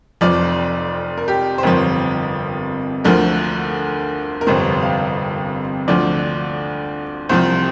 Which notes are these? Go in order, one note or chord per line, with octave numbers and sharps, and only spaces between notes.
F1 F2 F3 D5
A#4
G4
C5
G1 F2 C3 F3 A#4
D2 D3 F3 A#4
A#4
G1 F2 C3 C5
F5
D2 D3 F3 D5
C2 C3 F3 C5